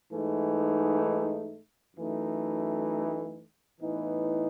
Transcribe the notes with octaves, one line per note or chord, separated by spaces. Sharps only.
G#2 E3 A3 D#4
F#2 E3 A3 D#4
A2 E3 B3 D#4